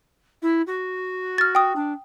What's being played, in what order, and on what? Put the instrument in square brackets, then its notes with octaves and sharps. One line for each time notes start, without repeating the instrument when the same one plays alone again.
[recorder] E4
F#4
[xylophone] F6 A6
G5 D#6
[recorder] D4